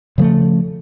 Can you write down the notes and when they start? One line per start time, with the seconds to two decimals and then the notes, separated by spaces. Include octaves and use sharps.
0.18 C#3 F3 G3 A3